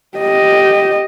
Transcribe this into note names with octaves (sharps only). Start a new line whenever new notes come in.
G4 D#5